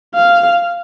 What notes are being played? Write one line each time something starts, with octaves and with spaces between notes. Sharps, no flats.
F5